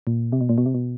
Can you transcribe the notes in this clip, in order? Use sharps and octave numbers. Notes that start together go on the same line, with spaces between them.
A#2
C3
B2
A#2
B2
C3
B2